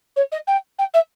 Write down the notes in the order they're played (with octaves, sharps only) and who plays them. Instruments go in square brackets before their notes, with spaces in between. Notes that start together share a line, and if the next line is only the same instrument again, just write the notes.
[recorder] C#5
D#5
G5
G5
E5